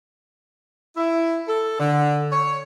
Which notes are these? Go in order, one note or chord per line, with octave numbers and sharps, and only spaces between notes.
E4
A4
D3
C#5